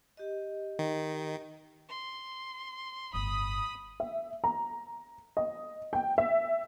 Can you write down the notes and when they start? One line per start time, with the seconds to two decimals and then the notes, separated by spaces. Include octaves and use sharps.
0.17 G4 D#5
0.79 D#3
1.89 C6
3.14 G1 A2 B5 D#6
4.00 E5
4.44 A#5
5.37 D#5
5.93 G5
6.18 E5